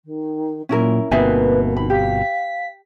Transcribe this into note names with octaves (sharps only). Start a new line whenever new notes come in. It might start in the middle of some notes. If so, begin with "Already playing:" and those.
D#3
A#2 F#3 C#4 E4 A#4
G1 B2 A#3 C4 D#4 B4 E5 G#5
D#3 B5
G4 F5 B6